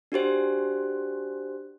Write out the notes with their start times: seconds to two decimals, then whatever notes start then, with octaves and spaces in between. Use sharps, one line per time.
0.12 D4 F#4 G4 C5